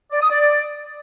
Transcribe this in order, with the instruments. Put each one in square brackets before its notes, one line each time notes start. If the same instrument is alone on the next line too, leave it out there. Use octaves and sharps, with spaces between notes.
[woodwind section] D5
D#6
D5